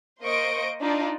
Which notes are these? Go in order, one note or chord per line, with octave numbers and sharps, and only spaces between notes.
A#3 C5 D#5 C#6 D7
D4 D#4 F4 D5